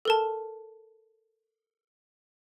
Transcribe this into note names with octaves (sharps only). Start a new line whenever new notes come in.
A4 A#4 A5